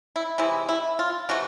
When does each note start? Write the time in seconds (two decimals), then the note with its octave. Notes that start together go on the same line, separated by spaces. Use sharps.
0.16 E4
0.38 C3 E3 G#3 E4
0.69 E4
0.99 F4
1.29 C3 E3 A3 F#4